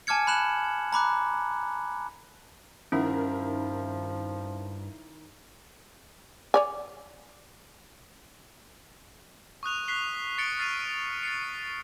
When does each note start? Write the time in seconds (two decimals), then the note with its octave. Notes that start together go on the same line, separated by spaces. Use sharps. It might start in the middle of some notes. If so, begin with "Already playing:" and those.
0.07 G#5 A5 D6 F6 G#6 C#7
0.27 B5 F#6 E7 F#7
0.93 A#5 B5 D6 F#6
2.92 G2 D#3 F3 C#4 E4 A#4
6.54 C#5 D5 G#5
9.63 C#6 D#6 F#6 F7
9.88 F#6 B6 C7 G7
10.38 C#6 A6 C#7 D7 G7
10.59 F6 A6 C7 D#7 F7
11.23 A6 C7 C#7